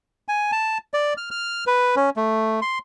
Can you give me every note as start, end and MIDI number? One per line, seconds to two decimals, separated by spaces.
0.28 0.51 80
0.52 0.78 81
0.94 1.14 74
1.17 1.30 89
1.31 1.64 89
1.67 1.95 71
1.96 2.10 61
2.16 2.60 57
2.62 2.79 84